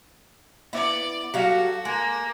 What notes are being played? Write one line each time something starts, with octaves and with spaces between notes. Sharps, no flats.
B3 E4 D5 D6
F#3 G3 F#4 A4 F5
G#3 A#3